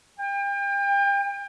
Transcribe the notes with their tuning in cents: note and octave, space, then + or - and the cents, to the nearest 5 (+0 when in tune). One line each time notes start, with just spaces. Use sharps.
G5 +35